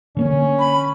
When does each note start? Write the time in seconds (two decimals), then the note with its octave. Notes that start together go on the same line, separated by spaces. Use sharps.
0.17 D3 A#3 C#4
0.59 B5